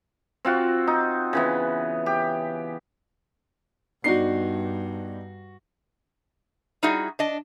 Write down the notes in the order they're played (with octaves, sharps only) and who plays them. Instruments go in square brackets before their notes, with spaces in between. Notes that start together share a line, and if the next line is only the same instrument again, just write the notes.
[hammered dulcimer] C4 F4 F#4
D#4
C#3 E3 B3
G4
[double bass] G2 [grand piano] B3 D4 D#4 [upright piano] F#4 C7
[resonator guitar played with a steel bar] G3 D#4 E4 F#4 G#4
D4 D#5